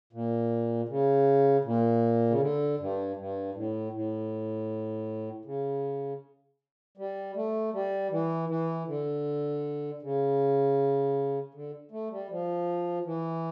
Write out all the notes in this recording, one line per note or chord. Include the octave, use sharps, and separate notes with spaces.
A#2
C#3
A#2
C#3
D3
G2
G2
A2
A2
C#3
G3
A3
G3
E3
E3
D3
C#3
D3
A3
G3
F3
E3